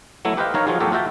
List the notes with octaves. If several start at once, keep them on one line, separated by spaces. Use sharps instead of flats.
F#3 A3 B3 E4
G4 B4 C5 D#5 F5 G5
D#3 D#4 A#4 C#5 F5
F3 F#3 F4 F#4 G#4
E2 A2 F#3 G4 A4 C#5
F4 F#4 E5 G5 A5